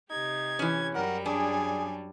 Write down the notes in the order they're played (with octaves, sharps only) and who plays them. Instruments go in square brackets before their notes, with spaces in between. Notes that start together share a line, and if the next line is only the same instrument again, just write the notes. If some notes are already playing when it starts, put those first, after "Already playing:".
[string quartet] C3 G4 G#6 [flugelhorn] D#4
[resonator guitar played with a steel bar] E3 C#4
[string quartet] F#2 F#3 G3 [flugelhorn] A#4 [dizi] F#5
[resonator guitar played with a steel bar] D4 [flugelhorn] G#4 [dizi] G#5